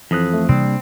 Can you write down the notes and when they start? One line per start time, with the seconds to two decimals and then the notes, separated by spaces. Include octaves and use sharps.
0.11 F2 E3 D#6 F#6
0.33 A3
0.49 C3 G3 A#3 C4 D4